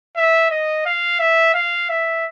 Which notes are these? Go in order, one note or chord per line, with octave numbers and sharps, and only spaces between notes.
E5
D#5
F5
E5
F5
E5